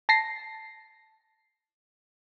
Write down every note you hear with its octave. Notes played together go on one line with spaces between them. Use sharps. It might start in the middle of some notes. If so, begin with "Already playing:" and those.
A5 A#6 C7